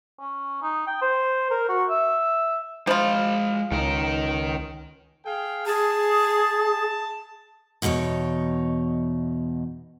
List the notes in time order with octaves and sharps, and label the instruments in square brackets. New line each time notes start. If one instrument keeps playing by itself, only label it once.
[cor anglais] C#4
D#4
G5
C5
A#4
F#4
E5
[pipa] F3 F4 [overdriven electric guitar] G#3 B5
[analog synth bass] C#2 [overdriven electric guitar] D#3 A#4
[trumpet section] G#4 F5 G5
[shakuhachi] G#4 [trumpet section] A5
[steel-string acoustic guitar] E2 B2 D#4 A#4 C#5